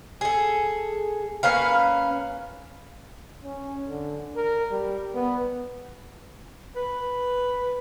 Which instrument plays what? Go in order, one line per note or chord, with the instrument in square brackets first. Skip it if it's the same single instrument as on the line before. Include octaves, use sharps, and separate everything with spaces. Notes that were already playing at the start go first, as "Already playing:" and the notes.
[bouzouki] G#4 A4
A#3 C#4 B4 F5
[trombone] C#4
D3
A#4
G3
B3
[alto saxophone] B4